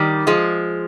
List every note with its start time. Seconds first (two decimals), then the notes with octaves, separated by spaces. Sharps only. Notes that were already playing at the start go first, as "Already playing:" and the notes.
Already playing: D#3 G3
0.27 F3 G#3